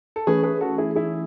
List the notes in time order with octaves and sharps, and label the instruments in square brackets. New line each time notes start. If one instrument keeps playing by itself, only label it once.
[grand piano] A4
[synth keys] E3 A3 C#4 [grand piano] G#4 B4
[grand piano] G#4 B4
F#4 A4
E4 G#4
E4 G#4